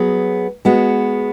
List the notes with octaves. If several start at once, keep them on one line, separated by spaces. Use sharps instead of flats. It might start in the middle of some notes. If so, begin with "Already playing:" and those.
Already playing: F#3 B3 G#4
G#3 B3 F#4